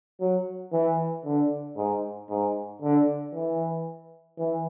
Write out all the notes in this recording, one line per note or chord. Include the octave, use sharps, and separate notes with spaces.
F#3
E3
D3
G#2
G#2
D3
E3
E3